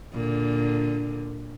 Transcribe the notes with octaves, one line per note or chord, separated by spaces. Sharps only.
A#2 D3